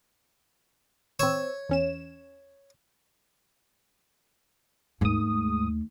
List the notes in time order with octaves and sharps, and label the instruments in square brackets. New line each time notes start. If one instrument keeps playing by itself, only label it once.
[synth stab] C4 E6 [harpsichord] C#5 C#6
[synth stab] E2 C#4 E7
[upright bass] D#2 A3 [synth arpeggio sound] G#2 D#6